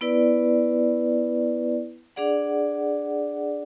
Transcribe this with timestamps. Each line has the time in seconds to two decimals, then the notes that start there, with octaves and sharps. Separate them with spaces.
0.01 B3 E4 B4 D5
2.16 D4 G#4 D5 F#5